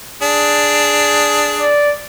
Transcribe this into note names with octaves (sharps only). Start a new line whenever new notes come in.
D4 G#4
D5